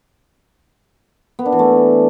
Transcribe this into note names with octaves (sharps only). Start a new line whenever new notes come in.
B3
D4
E3
A3